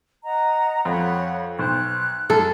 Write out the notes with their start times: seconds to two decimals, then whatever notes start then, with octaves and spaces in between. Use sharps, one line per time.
0.24 D#5 F#5 A#5
0.85 F2 C#5 F#5 B5
1.59 B1 C5 F#6
2.30 F#2 A4